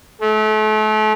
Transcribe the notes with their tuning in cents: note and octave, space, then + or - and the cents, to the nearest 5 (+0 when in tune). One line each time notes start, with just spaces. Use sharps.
A3 -35